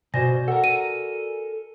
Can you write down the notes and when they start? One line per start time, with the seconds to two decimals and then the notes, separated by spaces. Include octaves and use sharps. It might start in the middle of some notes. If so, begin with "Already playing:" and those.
0.14 B2 F#4 C5 D5 G#5 A#6
0.48 A4 A#4 F#5
0.64 D#7